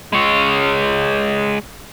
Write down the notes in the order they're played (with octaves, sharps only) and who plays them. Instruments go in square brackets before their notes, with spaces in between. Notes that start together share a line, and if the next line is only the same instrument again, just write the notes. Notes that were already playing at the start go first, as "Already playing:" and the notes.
[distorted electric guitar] G#3 C#5